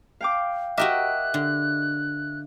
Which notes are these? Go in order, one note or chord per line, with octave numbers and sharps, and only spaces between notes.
F5 G5 D6
F#4 G4 A#4 D#5 E5 D6 F#6
D3